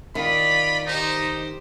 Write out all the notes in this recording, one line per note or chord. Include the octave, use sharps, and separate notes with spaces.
D#3 F4 D5 B5
D#4 G4 C5